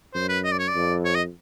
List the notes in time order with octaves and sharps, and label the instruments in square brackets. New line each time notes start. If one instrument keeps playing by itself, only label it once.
[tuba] F#2 [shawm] C5
[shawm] B4
D#5
D5
C#5
D5
[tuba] F2
[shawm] C#5
D#5